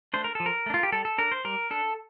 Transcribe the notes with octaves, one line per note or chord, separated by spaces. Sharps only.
A3 D4 C5
A#4
F3 A4
A#4
A3 D4
F4
G4
G3 A4
A4
D4 A#4
C5
G3 A#4
D4 A4